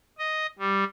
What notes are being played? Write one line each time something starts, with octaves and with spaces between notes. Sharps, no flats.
D#5
G3